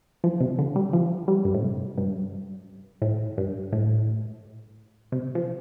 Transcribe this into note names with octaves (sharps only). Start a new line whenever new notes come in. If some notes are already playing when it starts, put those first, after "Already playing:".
F3
C3
D3
G3
F3
G3
G2
A2
C3
G2
A2
G2
A2
C3
F3